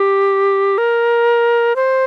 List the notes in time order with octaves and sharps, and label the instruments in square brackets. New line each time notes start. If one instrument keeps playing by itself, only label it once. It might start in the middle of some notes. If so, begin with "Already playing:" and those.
Already playing: [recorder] G4
A#4
C5